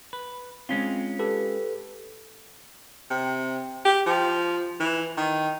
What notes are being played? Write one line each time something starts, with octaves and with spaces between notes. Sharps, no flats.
B4
G#3 C4 C#4 F4
G4 A4 B4
C3
G4
F3
E3
D#3